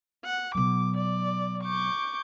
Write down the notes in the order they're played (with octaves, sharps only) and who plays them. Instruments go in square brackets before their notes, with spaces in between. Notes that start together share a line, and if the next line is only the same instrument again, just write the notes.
[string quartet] F#5
[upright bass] B2 F#3 [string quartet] D6
[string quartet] D5
C#6 D6 G6